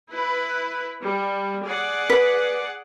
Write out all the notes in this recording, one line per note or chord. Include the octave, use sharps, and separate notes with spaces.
E4 B4
G3
G#4 D5 F#5
B4